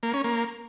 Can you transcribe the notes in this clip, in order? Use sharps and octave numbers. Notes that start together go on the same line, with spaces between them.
A#3
C#4
A#3